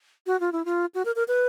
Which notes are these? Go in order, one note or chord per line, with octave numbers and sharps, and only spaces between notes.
F#4
F4
E4
F4
F#4
A#4
A#4
B4